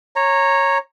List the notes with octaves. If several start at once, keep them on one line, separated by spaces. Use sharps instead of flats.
C#5 A#5